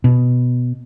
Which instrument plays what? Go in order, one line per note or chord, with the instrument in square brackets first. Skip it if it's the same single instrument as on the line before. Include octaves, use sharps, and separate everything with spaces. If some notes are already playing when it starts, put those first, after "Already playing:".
[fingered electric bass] B2